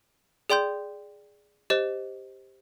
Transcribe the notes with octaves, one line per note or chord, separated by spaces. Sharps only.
G#4 D5 G5 C6 G6
G4 C5 D#5